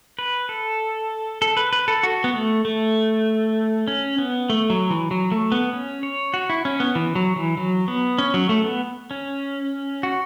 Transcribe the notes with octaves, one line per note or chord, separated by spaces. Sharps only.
B4
A4
A4
B4
B4
A4
F#4
B3
A3
A3
C#4
B3
A3
F#3
E3
F#3
A3
B3
C#4
C#5
F#4
E4
C#4
B3
E3
F#3
E3
F#3
B3
C#4
F#3
A3
B3
C#4
F#4